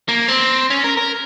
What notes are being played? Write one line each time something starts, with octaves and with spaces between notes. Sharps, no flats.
A#3
C4
C#4
A#4
A#4